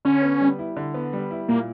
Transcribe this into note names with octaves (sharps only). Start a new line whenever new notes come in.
D3 C#4
B3
G3
E4
D3
B3
G3
E4
A#2 A#3